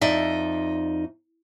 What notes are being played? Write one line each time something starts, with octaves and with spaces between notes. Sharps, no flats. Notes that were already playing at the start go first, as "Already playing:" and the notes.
F2 D#4 D5 E5